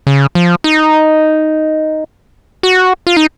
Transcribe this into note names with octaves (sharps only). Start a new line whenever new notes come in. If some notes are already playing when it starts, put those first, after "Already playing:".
C#3
F3
D#4
F#4
F4
D#4